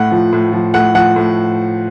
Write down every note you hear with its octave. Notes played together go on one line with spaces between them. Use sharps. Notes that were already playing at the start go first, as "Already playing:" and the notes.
Already playing: A2 F#5
F3
A2
F3
A2 F#5
F3 F#5
A2